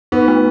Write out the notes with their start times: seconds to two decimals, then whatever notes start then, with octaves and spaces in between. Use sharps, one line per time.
0.12 B3 D#4
0.28 A3